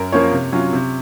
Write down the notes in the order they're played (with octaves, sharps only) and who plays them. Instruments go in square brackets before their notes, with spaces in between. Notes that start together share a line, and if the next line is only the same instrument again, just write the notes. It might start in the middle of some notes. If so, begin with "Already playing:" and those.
Already playing: [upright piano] F#2 A#4
F3 A#3 C#4 F4 C#5
C3
F#3 C#4 F4
C3